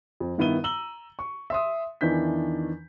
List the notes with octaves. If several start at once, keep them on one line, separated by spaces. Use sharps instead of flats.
F2
G2 D#3 B3 E4 D#7 G7
A#5 E6 F#7 G7
C#6
E5 C6 D#6
E2 D#3 E3 D4 G6 B6